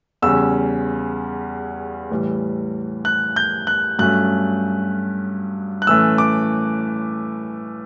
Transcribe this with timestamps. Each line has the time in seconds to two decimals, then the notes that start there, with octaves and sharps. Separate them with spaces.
0.22 E2 C#3 G3 C#4 E6
2.10 A2 E3 G3
3.05 F#6
3.36 G6
3.67 F#6
3.99 G2 F#3 A3 C#4 F#6
5.82 F#6
5.86 A2 E3 A3 C#4 E6
6.18 D6